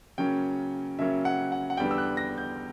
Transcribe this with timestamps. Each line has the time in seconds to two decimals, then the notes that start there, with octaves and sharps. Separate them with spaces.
0.18 C#3 F#3 A#3 C#4 G5
0.99 C#3 F#3 A#3 C#4 E5
1.25 F#5
1.52 F#5
1.70 F#5
1.77 E2 D3 G3 B3 D4 G5
1.91 E6
1.98 F#6
2.17 A#6
2.38 G6